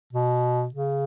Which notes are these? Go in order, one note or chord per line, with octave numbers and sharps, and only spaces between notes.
B2
C#3